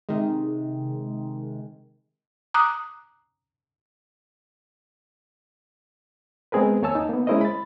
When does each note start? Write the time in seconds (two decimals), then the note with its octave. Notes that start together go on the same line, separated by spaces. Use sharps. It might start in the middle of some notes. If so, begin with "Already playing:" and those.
0.09 C3 D#3 G#3
2.54 A#5 D6 D#6 F#6
6.52 G#3 B3 C4 G#4 A#4 B4
6.82 D#2 A#3 C#5 G#5 A5 E6
6.95 D#4
7.09 A#3 B3
7.27 G#3 C#4 E4 A#4 C5 D#5
7.41 B5 A6